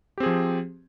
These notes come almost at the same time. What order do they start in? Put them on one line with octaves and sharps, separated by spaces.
G4 C4 G#4 F3